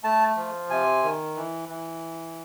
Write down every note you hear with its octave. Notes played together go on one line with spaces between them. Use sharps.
A3 A5
F3
C3 G#5
D#3
E3
E3